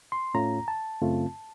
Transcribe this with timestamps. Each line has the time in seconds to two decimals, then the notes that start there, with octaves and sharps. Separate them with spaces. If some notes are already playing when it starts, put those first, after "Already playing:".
0.12 C6
0.34 A2 A3 C#4 F4 A#5
0.68 A5
1.02 F#2 C#3 A3 C4 F4